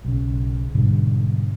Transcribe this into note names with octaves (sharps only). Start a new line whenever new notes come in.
B1 C#3
G#2 B2 D3 G3